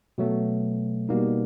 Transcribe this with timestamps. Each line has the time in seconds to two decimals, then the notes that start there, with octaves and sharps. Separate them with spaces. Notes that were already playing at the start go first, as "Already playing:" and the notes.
0.18 B2 F#3 A3
1.09 B2 G3 A#3 D#4